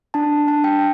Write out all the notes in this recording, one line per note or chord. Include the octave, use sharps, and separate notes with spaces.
D4 A5
D4 A5
G5